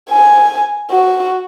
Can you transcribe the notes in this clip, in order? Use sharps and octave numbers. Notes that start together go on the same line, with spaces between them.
G#5
F#4